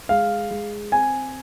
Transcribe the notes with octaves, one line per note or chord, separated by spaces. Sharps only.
G#3 F5
G#3
C4 G#5